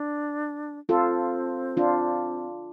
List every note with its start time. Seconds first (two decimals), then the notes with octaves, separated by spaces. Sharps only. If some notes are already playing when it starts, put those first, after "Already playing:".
Already playing: D4
0.89 C4 F4 A4
1.77 D4 F4